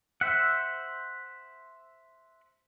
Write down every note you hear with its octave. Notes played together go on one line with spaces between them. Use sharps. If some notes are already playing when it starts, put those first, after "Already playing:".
C5 E5 F#5